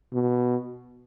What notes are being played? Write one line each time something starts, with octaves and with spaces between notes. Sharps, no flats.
B2